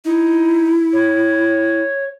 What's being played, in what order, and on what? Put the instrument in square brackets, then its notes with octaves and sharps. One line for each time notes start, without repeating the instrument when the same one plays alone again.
[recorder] D#4 [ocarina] E4
[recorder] C#5